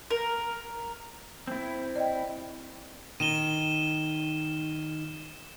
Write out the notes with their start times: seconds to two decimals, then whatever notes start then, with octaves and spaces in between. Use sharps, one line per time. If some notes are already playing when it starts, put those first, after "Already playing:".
0.10 A#4
1.47 C4 E4
1.96 D5 D#5 G5
3.20 D#3 D#7 E7 G7